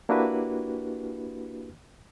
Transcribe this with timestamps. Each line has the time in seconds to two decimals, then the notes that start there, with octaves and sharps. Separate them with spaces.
0.09 A#3 D4 E4 F#4 G4 B4